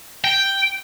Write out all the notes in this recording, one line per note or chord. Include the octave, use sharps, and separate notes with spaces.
G5